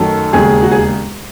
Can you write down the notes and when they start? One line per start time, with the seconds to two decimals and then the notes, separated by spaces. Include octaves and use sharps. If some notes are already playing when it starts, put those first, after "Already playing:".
Already playing: F#2 D#3 F#3 A3 A4
0.33 E1 D#2 C#3 G#4
0.62 F#4
0.71 G#4